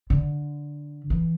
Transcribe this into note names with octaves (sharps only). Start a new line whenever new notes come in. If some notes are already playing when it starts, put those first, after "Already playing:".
D3
E3